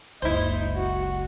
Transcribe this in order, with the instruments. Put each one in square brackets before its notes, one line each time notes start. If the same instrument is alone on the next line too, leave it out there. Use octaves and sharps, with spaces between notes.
[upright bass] F#1 C#2 [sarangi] D#4 [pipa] E4 C5
[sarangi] F#4